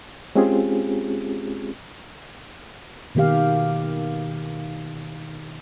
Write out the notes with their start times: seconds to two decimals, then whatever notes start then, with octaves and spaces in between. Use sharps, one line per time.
0.35 G#3 C4 C#4 F4 G4 G#4
3.15 B2 D#3 A#3 G4 F5